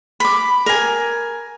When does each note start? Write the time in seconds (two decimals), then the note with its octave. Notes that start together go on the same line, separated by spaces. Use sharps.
0.20 B5 D6
0.66 A#4 G#5